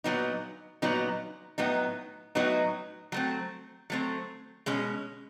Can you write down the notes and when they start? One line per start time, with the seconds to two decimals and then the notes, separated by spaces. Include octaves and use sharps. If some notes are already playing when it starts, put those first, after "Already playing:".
0.04 A#2 F#3 B3 D#4
0.82 A#2 F#3 B3 D#4
1.58 A2 F#3 B3 D#4
2.35 A2 F#3 B3 D#4
3.12 F#3 A3 C4
3.90 F#3 A3 C4
4.66 B2 G#3 C#4